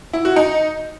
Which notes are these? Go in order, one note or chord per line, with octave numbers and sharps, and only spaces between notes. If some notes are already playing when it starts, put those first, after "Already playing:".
E4
F#4
D#4